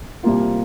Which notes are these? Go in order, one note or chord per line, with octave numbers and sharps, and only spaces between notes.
C2 C3 G3 A#3 F4